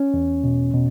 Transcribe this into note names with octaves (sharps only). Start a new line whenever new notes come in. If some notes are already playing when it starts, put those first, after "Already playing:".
Already playing: C#4
E2
B2
B2